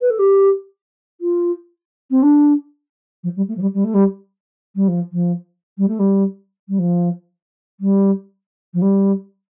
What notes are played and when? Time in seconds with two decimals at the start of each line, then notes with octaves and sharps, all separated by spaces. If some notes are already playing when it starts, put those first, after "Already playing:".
0.01 B4
0.10 A4
0.18 G4
1.20 F4
2.10 C4
2.22 D4
3.23 F3
3.36 G3
3.48 A3
3.57 F3
3.61 G3
3.74 G3
3.84 A3
3.94 G3
4.75 G3
4.87 F3
5.12 F3
5.77 G3
5.88 A3
5.99 G3
6.68 G3
6.78 F3
7.80 G3
8.73 F3
8.81 G3